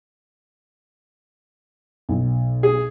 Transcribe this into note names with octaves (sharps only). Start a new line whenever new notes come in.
B1
G#4